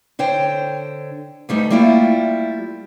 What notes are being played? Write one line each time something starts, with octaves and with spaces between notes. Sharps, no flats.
D3 C5 C#5 G5
D2 G2 G3 A3 D#4
G3 A3 A#3 E4 F4